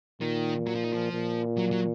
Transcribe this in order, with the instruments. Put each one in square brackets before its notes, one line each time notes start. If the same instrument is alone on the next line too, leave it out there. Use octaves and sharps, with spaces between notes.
[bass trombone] A#2 [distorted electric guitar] D#3
[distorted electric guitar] F#3
F3
D#3
F3
[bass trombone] A#2
[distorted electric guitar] F#3
F#3